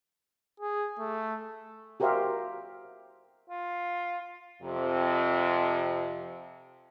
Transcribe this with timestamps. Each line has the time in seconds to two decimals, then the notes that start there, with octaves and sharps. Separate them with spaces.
0.60 G#4
0.99 A3
2.00 F#4 G4 A#4 C5 E5 F5
3.50 F4
4.63 F2 C3